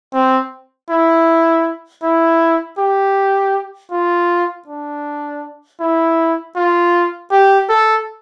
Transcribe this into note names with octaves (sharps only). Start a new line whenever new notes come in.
C4
E4
E4
G4
F4
D4
E4
F4
G4
A4